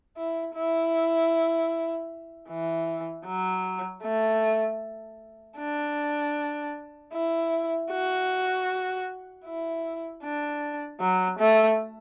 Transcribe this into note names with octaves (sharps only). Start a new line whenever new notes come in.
E4
E4
E3
F#3
A3
D4
E4
F#4
E4
D4
F#3
A3